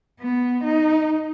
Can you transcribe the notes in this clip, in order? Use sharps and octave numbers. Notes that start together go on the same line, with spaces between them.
B3
D#4